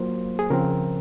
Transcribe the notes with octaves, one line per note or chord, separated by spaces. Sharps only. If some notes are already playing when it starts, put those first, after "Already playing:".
Already playing: F#3 A#3 F4 C5
G#4
C#3 F3 C4 A#4